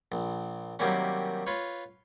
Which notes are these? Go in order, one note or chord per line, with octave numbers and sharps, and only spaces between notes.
A#1
C3 D#3 F#3 G3 A#3 C#4
F4 B4 C#5